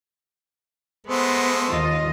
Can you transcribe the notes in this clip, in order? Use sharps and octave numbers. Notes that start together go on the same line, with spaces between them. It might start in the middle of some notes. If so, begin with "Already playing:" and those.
G#3 A3 B3 C5
D#2 F4 D#5